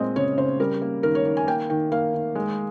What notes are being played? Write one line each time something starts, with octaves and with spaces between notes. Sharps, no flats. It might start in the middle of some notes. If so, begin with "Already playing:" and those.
Already playing: A#2 G#3 C4 D#5
C#3 C#5
C#3 C5
G3 A#4
A#3
D#3 A#4
C#5
D#3
G#5
A#3 G5
D#3 G5
A#3 F5
D#3
G#3